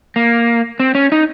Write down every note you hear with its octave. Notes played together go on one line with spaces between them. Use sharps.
A#3
C4
C#4
D#4